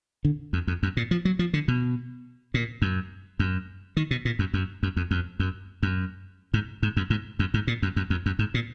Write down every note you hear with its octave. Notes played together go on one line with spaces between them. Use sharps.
D3
F2
F2
F#2
A#2
F3
F#3
F3
D3
B2
A#2
F#2
F#2
D#3
B2
A#2
F#2
F#2
F#2
F2
F2
F#2
F#2
G#2
G#2
F#2
G#2
F#2
G#2
A#2
F#2
F#2
F2
F#2
G#2
A#2